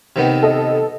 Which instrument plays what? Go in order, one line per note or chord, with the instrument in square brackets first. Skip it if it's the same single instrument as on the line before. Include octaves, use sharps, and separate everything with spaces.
[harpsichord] C3 D#3 B3
[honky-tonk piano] A4 D#5